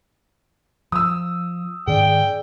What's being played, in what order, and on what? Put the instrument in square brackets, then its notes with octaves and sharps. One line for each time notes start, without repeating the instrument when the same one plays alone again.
[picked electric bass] F3 [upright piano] D#6 E6
[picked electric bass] G#2 D#3 C#4 [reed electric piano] G#4 D5 [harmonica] G5